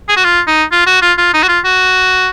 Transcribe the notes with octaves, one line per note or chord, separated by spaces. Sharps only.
G#4
F#4
F4
D#4
F4
F#4
F4
F4
D#4
F#4
F4
F#4